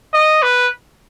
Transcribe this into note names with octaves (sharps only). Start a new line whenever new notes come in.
D#5
B4